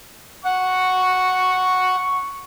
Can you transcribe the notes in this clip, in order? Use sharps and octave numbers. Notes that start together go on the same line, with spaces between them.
F#5 C#6